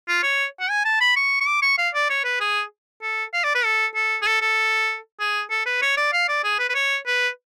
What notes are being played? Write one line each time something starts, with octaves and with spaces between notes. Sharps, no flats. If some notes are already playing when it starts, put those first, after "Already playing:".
F4
C#5
F#5
G#5
A5
B5
C#6
C#6
D6
C#6
F5
D5
C#5
B4
G#4
A4
F5
D5
B4
A4
A4
G#4
A4
A4
G#4
A4
B4
C#5
D5
F5
D5
G#4
B4
B4
C#5
B4